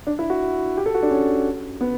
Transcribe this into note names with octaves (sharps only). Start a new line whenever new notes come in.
D4
E4
F#4
G4
A4
F#4
D4
C#4
B3